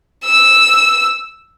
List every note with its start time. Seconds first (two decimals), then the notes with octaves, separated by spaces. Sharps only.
0.25 E6